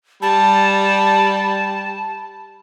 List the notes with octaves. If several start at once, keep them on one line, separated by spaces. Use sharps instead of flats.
G3 A5